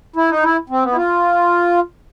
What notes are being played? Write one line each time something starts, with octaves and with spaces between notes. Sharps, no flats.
E4
D#4
E4
C4
B3
E4
F4